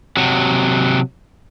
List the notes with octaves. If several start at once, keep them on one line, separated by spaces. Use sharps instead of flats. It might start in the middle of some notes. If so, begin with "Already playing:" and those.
C3 F#3